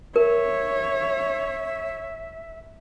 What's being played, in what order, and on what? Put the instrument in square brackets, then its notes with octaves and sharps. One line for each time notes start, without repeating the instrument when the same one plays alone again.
[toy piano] A#4 [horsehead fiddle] C#5 [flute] E5